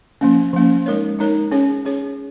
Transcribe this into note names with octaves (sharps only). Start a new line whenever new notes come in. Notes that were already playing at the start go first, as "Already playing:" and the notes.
F3 A#3 C#4
F3 A#3 C#4
G#3 D#4 A#4 C#5
G#3 D#4 A#4 C#5
C#4 G#4 C#5
C#4 G#4 C#5